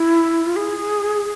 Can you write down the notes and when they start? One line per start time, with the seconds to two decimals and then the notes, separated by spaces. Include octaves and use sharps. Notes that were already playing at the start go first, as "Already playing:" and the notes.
Already playing: E4
0.46 F4
0.56 G#4